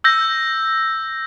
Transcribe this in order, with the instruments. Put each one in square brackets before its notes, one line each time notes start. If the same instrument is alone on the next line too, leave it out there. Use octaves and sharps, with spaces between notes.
[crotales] E6 G6 A#6